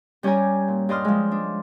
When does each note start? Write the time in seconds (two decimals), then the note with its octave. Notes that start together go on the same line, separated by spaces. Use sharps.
0.23 G3 C#4 G4 C#5 G#5 A#5
0.68 A#2
0.89 G2 D5 D#5 C6 F6
1.05 F3 G#3
1.31 D4